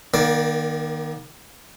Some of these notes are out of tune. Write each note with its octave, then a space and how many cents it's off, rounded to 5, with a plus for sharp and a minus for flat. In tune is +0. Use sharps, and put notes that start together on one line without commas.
D#3 -10 A#3 +35 D5 +0